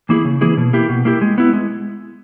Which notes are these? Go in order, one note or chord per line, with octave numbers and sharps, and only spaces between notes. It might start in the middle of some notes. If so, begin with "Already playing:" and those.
E3 A#3 E4 G#4
C#3
E3 A#3 E4 G#4
B2
A#3 E4 G4
B2
A#3 E4 G4
G#3
B3 E4
G#3